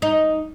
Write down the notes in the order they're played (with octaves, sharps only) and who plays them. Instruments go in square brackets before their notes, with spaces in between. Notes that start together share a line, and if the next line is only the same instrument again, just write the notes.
[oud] D#4